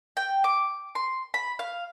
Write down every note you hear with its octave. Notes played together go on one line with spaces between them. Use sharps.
G5
D6
C6
B5
F5